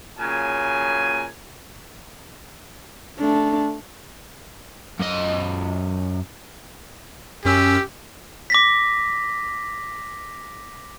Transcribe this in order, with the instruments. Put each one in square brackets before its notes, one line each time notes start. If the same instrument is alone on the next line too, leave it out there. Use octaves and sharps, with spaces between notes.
[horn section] A#2 C#3 F#3 G#5
[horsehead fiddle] A3 D4
[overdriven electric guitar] F#2 D#5
[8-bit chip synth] F#2 C#4 E6 [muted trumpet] G4
[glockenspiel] D6 A#6 B6